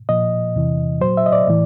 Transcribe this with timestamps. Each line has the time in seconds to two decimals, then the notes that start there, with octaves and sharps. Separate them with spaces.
0.09 A#2 F3 D#5
0.56 E2 C3 E3
1.01 A#2 F#3 C5
1.17 E5
1.26 D#5
1.32 D5
1.47 A2 E3